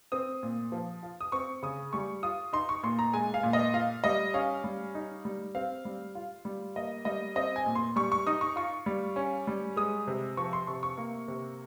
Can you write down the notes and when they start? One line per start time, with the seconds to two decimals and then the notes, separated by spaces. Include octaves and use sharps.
0.12 C4 D#6
0.43 A#2
0.72 F3
1.03 F4
1.21 D#6
1.32 C4 C#6
1.63 C#3 D#6
1.93 G3 C#6
2.23 F4 D#6
2.53 D#4 C6
2.69 C#6
2.83 A#2 C6
2.99 A#5
3.14 G#3 G#5
3.34 F5
3.43 A#2
3.53 D#5
3.74 F4 F5
4.04 G3 D#5
4.34 C#4 F5
4.64 G3
4.95 D#4
5.25 G3
5.55 C4 F5
5.85 G3
6.15 F4
6.45 G3
6.76 A#3 D#5
7.05 G3 D#5
7.36 C4 D#5
7.56 G#5
7.66 A#2
7.75 C6
7.96 G3 C#6
8.12 C#6
8.27 D#4 D#6
8.41 C#6
8.56 F4 C#6
8.86 G3
9.16 C#4
9.47 G3
9.76 G#3 D#6
10.07 C3
10.37 F3 C#6
10.53 C6
10.67 C3 C#6
10.83 C#6
10.97 A#3
11.28 C3